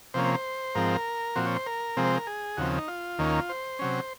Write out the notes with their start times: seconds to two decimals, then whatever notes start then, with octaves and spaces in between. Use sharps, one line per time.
0.14 C3 F3 A#3 C#4 C5
0.25 C5
0.35 C5
0.75 G#2 F3 C4 A#4
1.36 A#2 F3 C4 F#4
1.46 C#5
1.56 C5
1.67 A#4
1.97 C3 F3 G#3 C4
2.04 C5
2.16 A#4
2.27 G#4
2.57 D#2 C#3 F3 C4 F#4
2.78 D#4
2.88 F4
3.19 D#2 D#3 A#3 C#4
3.49 C5
3.79 C3 F#3 C#4